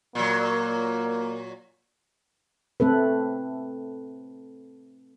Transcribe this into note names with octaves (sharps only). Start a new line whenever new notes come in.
A#2 F#3 A#3
A3 C4 A4 B4